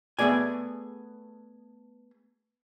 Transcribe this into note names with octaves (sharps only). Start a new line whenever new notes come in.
A3 B3 G#4 D5 G#5